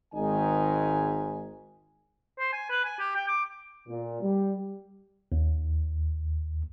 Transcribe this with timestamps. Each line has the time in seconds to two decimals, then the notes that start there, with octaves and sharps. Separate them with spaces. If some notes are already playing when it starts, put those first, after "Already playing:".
0.14 G#1 G#2 D#3 D#4 G#5
2.39 C5
2.52 G#5
2.70 B4
2.84 G#5
2.99 G4
3.15 G5
3.28 D6
3.88 A#2
4.21 G3
5.32 D#2